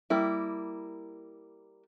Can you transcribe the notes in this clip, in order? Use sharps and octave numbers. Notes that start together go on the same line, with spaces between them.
G3 A#3 E4